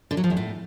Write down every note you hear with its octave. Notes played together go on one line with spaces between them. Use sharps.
D3
F#3
F3
E2
A2